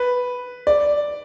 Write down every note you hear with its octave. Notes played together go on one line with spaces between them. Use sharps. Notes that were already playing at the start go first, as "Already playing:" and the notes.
Already playing: B4
D5